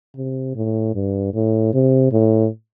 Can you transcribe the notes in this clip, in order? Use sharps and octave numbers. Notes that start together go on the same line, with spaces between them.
C3
A2
G2
A2
C3
A2